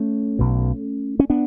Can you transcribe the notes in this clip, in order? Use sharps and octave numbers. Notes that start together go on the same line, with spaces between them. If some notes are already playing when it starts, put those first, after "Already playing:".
Already playing: A3 C#4
B1 B2
C#4
B3 D4